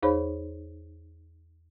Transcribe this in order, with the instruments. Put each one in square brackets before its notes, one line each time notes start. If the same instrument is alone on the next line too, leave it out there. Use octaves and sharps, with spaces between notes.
[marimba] E2 D#4 G#4 C5 C#5 B5